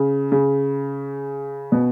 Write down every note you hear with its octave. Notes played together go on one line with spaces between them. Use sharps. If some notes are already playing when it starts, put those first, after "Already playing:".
Already playing: C#3
C#3
B2